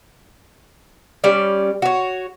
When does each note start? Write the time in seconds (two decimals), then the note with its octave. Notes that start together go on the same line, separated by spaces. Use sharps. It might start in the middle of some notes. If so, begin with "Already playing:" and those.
1.24 G3 C#4 D5
1.82 F#4 C#5